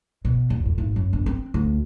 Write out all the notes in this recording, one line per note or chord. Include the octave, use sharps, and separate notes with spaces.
B2
D#2
F2
G#1
F#2
G1
C4
D2